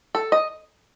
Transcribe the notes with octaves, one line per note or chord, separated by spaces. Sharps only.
A4
D#5